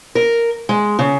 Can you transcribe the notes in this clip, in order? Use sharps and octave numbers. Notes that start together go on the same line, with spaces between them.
A#4
G#3
C#3